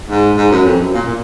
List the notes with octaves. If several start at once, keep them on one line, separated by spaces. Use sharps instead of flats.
G#2
G#2
F#2
F2
F#2
A#2
A#2